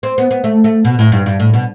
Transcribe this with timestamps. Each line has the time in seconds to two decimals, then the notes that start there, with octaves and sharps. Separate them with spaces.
0.03 C4
0.18 B3
0.31 B3
0.44 A3
0.64 A3
0.85 B2
0.99 A2
1.12 G2
1.26 G2
1.40 A2
1.53 B2